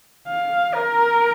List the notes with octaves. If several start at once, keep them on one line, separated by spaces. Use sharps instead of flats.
F5
A#4